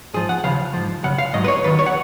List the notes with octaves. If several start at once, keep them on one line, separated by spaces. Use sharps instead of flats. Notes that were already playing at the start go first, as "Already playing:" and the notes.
G#2 F3 G#4
F#5
D#2 C#3 F3 F5
G#2 F3
F#2 C#3 F#5
F5
G#2 F#3 D#5
B4
C#5
D#2 D#3 F#3 B4
C#5
F#5